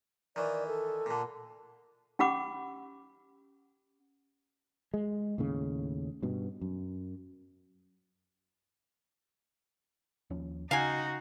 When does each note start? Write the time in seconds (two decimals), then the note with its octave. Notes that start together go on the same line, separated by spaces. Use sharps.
0.36 D#3 E3 D5
0.68 A4
1.06 A#2 D3
2.19 C#4 G4 F#5 B5 D6
4.94 G#3
5.38 D#2 A2 C#3
6.23 G2 B2
6.61 F#2
10.30 D#2 F3 C#4
10.71 C#3 D#4 F#4 F5 G5 G#5